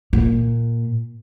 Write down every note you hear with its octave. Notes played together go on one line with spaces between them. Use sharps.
A#2